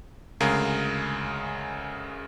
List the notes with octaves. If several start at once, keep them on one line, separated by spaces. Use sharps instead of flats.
D2 C#3 G#3 G#4 A#4 F5